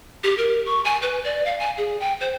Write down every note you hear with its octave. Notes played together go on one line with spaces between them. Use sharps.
G4
A#4
C#6
G#5
B4
D5
F5
G#5
G#4
G5
C5